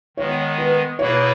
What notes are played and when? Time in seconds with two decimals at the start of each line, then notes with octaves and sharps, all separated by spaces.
0.17 D#3 G#3 B3 C#5
0.58 B4
0.99 B2 A#3 E4 G#4 B4 C#5